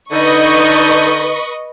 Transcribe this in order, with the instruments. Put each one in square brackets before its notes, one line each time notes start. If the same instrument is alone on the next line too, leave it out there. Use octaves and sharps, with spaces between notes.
[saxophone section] D3 D#4 [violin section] B4 D#5 C#6